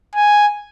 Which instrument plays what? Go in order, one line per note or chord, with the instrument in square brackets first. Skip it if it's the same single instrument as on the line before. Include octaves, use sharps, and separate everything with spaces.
[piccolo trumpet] G#5